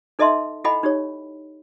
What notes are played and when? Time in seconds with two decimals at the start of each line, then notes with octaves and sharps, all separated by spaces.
0.19 D#4 A4 D#5 E5 A5 C6
0.64 E4 A4 D#5 F#5 G#5 B5
0.83 D#4 G4 C#5